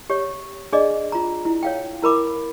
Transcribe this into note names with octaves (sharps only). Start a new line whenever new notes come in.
G4 C#5
D4 G#4 D5 D#5
F4 A#5
E4
C#5 F5 G5
E4 A#4 B5 D6